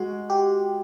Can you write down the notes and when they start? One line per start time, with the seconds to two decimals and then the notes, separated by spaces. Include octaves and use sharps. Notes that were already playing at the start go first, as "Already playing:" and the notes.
Already playing: G#3 F#4
0.30 G4